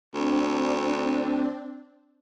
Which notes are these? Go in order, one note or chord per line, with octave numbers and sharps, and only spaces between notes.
D2 C4 D4